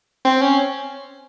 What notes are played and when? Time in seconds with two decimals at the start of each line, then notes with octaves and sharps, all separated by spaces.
0.25 C4
0.41 C#4